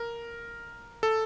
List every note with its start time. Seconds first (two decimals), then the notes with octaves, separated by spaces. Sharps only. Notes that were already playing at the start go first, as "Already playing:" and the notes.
Already playing: A#4
1.03 A4